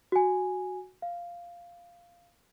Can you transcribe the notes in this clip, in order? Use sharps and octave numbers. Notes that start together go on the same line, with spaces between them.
F#4 G#5
F5